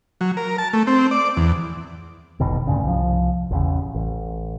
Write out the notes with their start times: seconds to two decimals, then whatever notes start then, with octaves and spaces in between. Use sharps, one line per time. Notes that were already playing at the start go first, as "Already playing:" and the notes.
0.21 F#3
0.37 A#4
0.58 A5
0.73 A3
0.87 C4
1.11 D5
1.37 E2
2.40 E1 A1 B2 D#3
2.67 D2 G2 C#3
2.84 C2 F3
3.51 A1 E2 C#3
3.94 A1